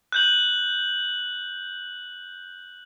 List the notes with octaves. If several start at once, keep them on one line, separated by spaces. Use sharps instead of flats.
F#6 G6 F#7